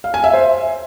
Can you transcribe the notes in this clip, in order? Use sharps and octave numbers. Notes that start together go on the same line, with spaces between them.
F5
G#5
E5
C5